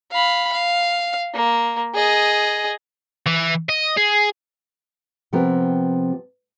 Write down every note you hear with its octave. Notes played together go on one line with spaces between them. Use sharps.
F5 B5
F5
A#3
G#4 D#5
E3
D#5
G#4
C3 F3 B3 C4 A#4